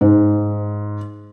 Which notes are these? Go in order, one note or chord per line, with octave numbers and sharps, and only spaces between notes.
G#2